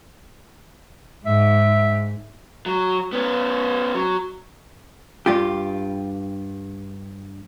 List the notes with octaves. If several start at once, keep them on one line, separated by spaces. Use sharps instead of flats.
G#2 E5
F#3
B3 C#4
F#3
G2 F4 G4